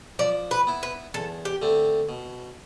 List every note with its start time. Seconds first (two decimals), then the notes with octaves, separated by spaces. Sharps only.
0.19 F3 D5
0.51 B4
0.67 B3 E4
0.83 B4
1.14 E2 A4
1.45 G4
1.62 D3 A3 C4
2.09 B2